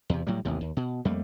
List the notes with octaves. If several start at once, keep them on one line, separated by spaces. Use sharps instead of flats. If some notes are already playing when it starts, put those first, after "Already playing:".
E2 C3
A2 F#3 G3
A1 D#2 C3
D#2
B2
F2 G3 A3 A#3